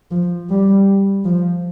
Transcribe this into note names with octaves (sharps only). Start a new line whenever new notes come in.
F3
G3
F3